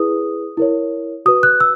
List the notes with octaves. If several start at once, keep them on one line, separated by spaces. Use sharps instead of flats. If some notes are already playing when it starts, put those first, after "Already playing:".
Already playing: E4 G#4 B4 D#6
E4 A#4 C#5
F#4 B4 D#6
F#6
E6